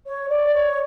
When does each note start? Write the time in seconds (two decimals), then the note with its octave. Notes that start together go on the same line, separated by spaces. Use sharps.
0.06 C#5
0.29 D5
0.53 C#5